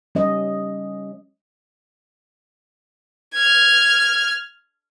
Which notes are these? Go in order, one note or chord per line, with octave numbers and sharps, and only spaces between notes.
G3 C#4 D#5
F6 G#6